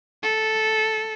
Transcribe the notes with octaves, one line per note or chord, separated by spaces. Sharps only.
A4